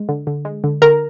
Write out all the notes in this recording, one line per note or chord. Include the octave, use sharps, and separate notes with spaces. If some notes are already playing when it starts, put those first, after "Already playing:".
Already playing: G#3
D3
D3
G#3
D3
D3 A#4 A#5